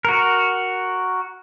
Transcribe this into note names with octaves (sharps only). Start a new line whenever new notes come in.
F#4 A#4